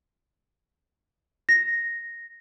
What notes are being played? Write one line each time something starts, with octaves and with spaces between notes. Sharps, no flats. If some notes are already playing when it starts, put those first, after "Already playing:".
A#6